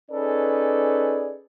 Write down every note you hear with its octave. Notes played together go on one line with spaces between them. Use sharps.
C#4 D#4 G#4 A4 B4 D5